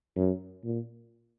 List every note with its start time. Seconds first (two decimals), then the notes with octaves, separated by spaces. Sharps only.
0.16 F#2
0.64 A#2